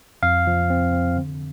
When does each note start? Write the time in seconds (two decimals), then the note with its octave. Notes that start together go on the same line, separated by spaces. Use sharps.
0.23 F2 F5
0.47 F3
0.70 C4
0.93 C4
1.17 D3